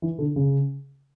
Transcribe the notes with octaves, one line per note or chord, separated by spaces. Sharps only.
E3
D3
C#3